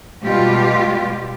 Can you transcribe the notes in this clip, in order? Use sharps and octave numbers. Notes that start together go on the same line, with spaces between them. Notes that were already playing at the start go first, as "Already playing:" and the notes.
B2 G3 G#3 F4 G4